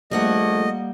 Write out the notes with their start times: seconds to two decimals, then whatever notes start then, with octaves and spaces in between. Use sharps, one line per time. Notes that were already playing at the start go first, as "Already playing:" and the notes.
0.11 A#1 G3 A3 A#3 D#5 F#5